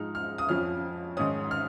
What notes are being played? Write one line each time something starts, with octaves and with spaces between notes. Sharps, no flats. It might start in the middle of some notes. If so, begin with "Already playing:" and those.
Already playing: G#2 F3 G#3 D#4 F6
F6
D#6
F2 F3 C#4 F6
G#2 D#3 C#4 D#6
F6